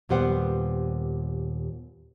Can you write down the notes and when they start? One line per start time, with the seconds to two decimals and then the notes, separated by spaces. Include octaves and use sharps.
0.09 D#2 A#2 G3 B3 C5 F#5